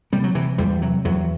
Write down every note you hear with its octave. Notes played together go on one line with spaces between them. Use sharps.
C3 G3
F#3
C3 E3
E2 G3
C3 F#3
E2 F#3